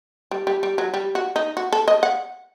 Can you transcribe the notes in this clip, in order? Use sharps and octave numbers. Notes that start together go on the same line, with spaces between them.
G3
G3
G3
F#3
G3
F#4
D#4
F#4
A4
D#5
F#5